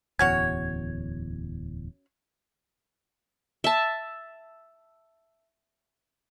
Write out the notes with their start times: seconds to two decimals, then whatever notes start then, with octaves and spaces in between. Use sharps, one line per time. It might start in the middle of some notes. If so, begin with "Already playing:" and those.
0.19 D1 E2 C#4 F#4 C#5 G#6
3.64 E5 A5